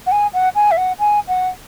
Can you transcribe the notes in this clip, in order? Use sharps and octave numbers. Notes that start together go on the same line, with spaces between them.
F#5
G#5
F#5
G#5
E5
F#5
G#5
F#5